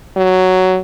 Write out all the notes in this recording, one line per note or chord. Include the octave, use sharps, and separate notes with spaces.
F#3